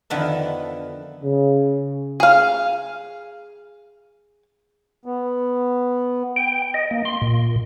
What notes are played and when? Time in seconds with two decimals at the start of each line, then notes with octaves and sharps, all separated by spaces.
0.10 F2 D3 D#3 B3 B4 E5
1.23 C#3
2.20 G#4 F5
5.06 B3
6.36 G5
6.74 D#5
6.91 A#3
7.05 C6
7.22 A#2